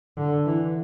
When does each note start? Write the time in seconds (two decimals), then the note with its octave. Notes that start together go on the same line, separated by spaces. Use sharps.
0.17 D3
0.46 E3